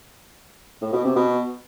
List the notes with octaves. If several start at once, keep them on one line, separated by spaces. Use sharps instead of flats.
A2
B2
C3
B2